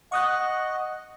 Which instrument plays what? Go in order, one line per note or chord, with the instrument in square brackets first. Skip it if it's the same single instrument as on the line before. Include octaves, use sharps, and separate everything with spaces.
[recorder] D#5 [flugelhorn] F#5 [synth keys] C#6 D#6 F#6